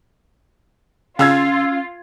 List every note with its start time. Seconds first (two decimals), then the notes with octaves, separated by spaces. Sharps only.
1.19 C#3 C#4 F4 F5 E6 G#6